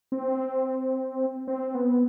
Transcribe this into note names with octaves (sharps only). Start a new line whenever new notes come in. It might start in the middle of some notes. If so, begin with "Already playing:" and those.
C4
C4
B3